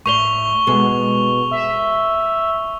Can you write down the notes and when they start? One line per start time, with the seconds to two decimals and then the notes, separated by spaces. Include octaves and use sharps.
0.06 A2 C5 D5 C#6 F7 G7
0.67 B2 G#3 A4
1.51 E5